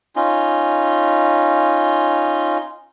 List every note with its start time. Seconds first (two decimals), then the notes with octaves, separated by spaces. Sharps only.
0.16 C#4 D#4 F4